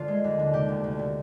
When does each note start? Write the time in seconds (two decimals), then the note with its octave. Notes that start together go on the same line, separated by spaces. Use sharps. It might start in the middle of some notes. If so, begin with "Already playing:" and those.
Already playing: D3 F3 A#3 F4
0.08 G#3
0.24 D#2
0.39 D3
0.53 C3 G4
0.69 D2
0.84 D2
0.99 C3